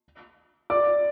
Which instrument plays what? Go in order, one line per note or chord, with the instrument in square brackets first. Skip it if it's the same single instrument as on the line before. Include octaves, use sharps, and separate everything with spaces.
[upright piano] D5 D6